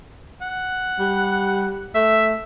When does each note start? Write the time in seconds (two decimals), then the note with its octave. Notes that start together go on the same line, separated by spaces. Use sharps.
0.42 F#5
0.99 G3
1.95 A3 E5